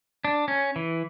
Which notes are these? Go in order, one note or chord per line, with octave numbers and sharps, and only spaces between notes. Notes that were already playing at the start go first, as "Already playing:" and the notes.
D4
C#4
E3